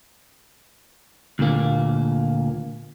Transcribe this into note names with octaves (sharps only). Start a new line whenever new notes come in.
D2 A#2 A#3